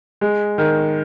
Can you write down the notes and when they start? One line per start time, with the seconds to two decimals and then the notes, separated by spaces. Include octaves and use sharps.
0.21 G#3
0.58 D#3